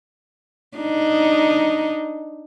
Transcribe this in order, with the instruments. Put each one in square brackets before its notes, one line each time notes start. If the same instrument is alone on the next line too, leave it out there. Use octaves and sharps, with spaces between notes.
[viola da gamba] D4 D#4